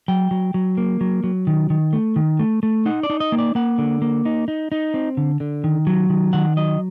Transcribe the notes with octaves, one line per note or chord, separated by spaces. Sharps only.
F#3 G5
F#3
F#3
A#3
F#3
F#3
D#3
D#3
A3
D#3
A3
A3
D#4 F#5
D5
D#4
D#5
A#3
D5
A#3 F#5
D3
A#3
D#4
D#4
D#4
C4
D3
D3
D#3
F#3
D#3
D#3 F#5
F#3 D#5